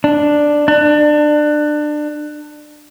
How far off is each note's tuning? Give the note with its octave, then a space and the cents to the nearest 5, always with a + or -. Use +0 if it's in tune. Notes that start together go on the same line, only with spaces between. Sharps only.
D4 +5
D4 +25